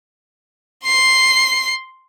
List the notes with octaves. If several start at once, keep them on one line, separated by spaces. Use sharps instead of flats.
C6 C7